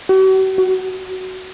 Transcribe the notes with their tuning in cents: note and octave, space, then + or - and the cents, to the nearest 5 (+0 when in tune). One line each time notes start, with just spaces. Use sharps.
F#4 +45
F#4 +10